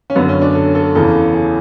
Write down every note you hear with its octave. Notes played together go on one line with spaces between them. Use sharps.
C#4
F#2 D3 B3
C#4
D4
A4
A4
E2 C#3 E3 A4
G#4